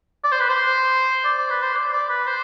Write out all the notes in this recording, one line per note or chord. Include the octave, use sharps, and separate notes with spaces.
D5
C5
B4
C5
D5
D5
B4
C5
D5
D5
B4
C5